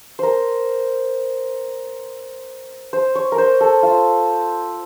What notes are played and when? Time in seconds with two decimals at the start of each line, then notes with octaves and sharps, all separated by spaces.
0.19 A#4 C5
2.93 C5
3.15 C#5
3.32 A#4
3.38 C5
3.61 A4
3.83 F4